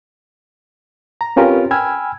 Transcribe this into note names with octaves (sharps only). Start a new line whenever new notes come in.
A#5
C4 C#4 F4 G4 A#4 B4
G5 G#5 B5 E6 F6 G#6